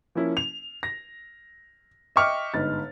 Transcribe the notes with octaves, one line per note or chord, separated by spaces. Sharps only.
F3 A#3 C#4 E4
F7
A#6
D#5 E5 G5 C#6 D6 F6
G1 G#2 D#4 B4 A6